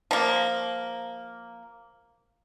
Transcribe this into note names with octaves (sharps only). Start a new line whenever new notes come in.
F3 A#3